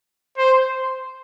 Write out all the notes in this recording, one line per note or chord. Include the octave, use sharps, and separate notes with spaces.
C5